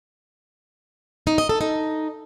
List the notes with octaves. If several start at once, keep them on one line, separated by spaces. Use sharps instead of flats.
D#4
D#5
A4
D#4